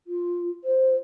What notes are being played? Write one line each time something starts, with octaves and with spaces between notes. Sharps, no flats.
F4
C5